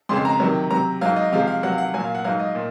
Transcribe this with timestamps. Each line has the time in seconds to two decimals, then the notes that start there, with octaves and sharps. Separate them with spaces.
0.09 F2 C#3 G#3 C6
0.25 A#5
0.40 C3 D#3 F#3
0.71 C3 F#3 A#5
1.01 G#2 F#3 F5
1.16 D#5
1.32 C3 F3 G#3 F5
1.47 F5
1.63 C3 F#3 F#5
1.72 F5
1.78 F#5
1.94 A#2 F#3 G#5
2.04 F5
2.15 F#5
2.24 G#2 F#3 F5
2.40 D#5
2.55 A#2